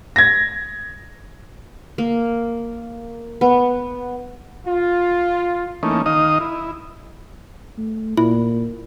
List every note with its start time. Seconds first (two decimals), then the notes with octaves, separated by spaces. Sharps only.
0.16 G#6 A#6
1.98 A#3
3.41 B3
4.66 F4
5.83 E3 A3 A#3 C#4 D#4
6.06 D#3 D#4 D#5 F5 D#6
6.41 E4
7.78 A3
8.17 A#2 E4